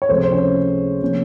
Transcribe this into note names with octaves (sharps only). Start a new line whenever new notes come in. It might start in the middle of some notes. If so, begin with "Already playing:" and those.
C#5
C#2 C3 F3 A3 C5
C5
C#4 C#5
C3 F3 A#3 C#4